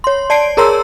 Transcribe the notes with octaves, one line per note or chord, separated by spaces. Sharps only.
C#5 C6
D5 A5 C7 D7
G#4 A#4 C#5 A#5 C6 E6